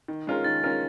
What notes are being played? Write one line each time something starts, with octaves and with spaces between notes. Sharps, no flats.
D#3
G#3 C#4 F4 A#4
D#3 A6
G#3 C#4 F4 A#4